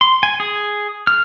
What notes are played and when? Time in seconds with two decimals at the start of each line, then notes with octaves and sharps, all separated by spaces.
0.01 C6
0.23 G#5
0.40 G#4
1.07 F6